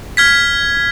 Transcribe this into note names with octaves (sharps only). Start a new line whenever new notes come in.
F6 G#6 B6